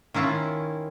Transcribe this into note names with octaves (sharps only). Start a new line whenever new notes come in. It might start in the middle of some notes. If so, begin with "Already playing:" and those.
D#3 C#4 E4 F4